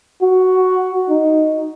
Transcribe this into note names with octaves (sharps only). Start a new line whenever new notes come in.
F#4
D#4